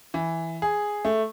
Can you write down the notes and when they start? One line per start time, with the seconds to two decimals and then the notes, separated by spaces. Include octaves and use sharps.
0.14 E3
0.62 G#4
1.05 A3